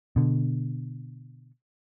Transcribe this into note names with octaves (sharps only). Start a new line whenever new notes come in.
B2 D3